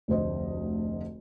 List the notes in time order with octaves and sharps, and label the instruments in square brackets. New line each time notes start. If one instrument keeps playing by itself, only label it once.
[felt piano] F1 D2 C5 D#5